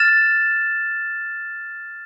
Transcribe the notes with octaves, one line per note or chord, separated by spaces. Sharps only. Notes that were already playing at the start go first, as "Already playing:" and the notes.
Already playing: F6 A6 E7